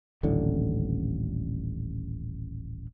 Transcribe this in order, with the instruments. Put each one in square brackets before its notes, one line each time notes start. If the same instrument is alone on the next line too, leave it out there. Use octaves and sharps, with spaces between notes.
[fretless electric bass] D#1 A1 A2 D3